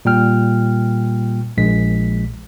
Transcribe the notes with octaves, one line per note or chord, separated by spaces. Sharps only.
A#2 G3 G5 F6
A#1 G#3 B6